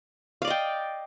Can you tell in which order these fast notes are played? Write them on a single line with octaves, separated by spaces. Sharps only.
F5 D5 D#5 G5